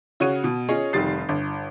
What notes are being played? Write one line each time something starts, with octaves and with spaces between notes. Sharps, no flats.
C#3 F#4 C#5 D#7
B2
C#4 F4 G#4 C#5 D#5
F1 D#3 G3 A6 C7
G1